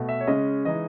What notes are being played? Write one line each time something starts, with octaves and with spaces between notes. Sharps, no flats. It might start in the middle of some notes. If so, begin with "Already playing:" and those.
Already playing: B2 A3
E5
C#5
C#3 G#3 C#4 D#5
E3 G#3 D#4 D#5